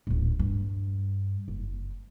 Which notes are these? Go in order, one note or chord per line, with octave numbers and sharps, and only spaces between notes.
D1 A#1
G2
F#1